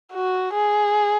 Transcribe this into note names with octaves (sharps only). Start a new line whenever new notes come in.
F#4
G#4